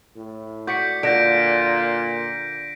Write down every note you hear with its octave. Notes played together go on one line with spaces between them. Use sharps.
A2
F#4 D5 G6 B6 C#7
A#2 D3 G6 A#6 D7